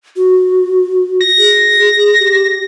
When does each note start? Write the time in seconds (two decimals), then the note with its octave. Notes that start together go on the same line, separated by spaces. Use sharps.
0.16 F#4
1.21 A#6
1.38 G#4
2.20 G4